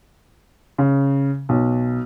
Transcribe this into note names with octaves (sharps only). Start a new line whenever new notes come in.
C#3
B1